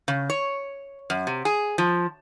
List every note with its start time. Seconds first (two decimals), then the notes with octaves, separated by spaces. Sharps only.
0.08 C#3
0.30 C#5
1.10 F#2
1.27 C3
1.45 G#4
1.78 F3